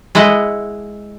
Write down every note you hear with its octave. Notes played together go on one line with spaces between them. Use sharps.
G#3 E4 D#5 F#5